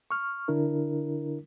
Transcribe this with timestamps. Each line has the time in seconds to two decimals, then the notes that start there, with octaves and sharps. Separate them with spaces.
0.11 C#6 F6
0.48 D3 D4 E4 A#4